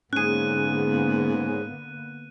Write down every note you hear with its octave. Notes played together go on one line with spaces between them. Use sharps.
G#2 D3 A#3 B3 C#4 G#4 F#6 D#7